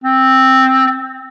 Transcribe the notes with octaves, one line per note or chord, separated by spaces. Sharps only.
C4